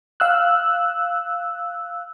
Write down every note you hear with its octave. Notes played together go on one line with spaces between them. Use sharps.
F5 E6 F#6